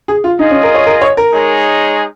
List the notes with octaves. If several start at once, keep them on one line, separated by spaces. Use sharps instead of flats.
G#4
F4
D#4 F4 G#4 D#5
C#4
A#4
C#5
A#4
C#5
A#4
G#3 D#4 G#4 C#5